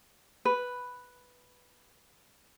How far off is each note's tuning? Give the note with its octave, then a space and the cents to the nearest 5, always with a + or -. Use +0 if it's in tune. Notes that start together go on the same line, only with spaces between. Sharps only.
B4 +0